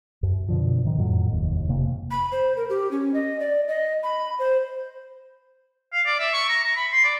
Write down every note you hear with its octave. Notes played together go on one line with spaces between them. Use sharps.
F#2
B2 D3 F3
G#2 D#3
F2 A2 F#3
F1 D#2
F1 C3 A#3
B5
C5
A#4
G4
C#4
D#5
D5
D#5
B5
C5
F5
D5
E5
C#6
A#5
A#5
B5
C6
D5